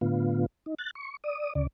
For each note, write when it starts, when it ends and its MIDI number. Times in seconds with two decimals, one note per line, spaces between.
0.01 0.46 45
0.01 0.46 50
0.01 0.46 59
0.01 0.46 65
0.66 0.74 63
0.79 0.91 90
0.79 0.91 93
0.95 1.17 85
1.24 1.53 74
1.24 1.53 87
1.55 1.67 38
1.55 1.67 49
1.55 1.67 74